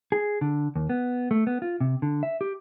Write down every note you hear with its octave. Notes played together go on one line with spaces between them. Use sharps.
G#4
D3
D#2
B3
A3
B3
F4
C3
D3
E5
G4